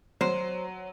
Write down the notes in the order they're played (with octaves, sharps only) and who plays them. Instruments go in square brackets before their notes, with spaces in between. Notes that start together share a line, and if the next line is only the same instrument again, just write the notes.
[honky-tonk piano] F#3 [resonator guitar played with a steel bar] C5